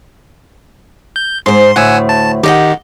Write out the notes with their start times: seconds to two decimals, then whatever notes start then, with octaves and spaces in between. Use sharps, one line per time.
1.16 G6
1.46 G#2 C5 C6
1.76 D2 A2 F#5 G#5 E6
2.09 A5
2.43 D#3 G4 D#5 F#5